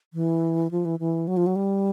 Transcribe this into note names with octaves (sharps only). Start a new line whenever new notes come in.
E3
F3
E3
E3
F#3
F3
F#3
G3